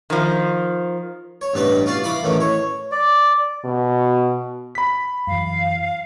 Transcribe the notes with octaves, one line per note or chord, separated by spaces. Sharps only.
D#3 F3
C#5
A1 G2 B3 B4 D5 D#5
F4 F#4 D5 F5
E3 F5 B5 D6 D#6
F#2 A2 D#3 E3 F#3
C#5
D5
B2
B5 B6
F#2 E3 F5